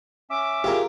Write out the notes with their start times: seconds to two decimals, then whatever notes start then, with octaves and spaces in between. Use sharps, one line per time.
0.30 C#4 E5 D6
0.64 F4 G4 G#4 A#4